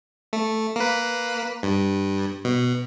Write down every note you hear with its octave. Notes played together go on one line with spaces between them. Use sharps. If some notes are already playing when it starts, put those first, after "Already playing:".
A3
A#3 B4
G2
B2